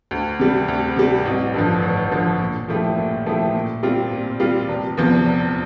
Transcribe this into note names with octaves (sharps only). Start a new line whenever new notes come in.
D2
C3 G3
D2
C3 G3
A1
G2 D3 F3
A1
G2 D3 F3
A#2
F3 A3 E4 G4
A#2
F3 A3 E4 G4
A#2
G3 C4 F4
A#2
G3 C4 F4
F1
E2 C3 F3
F1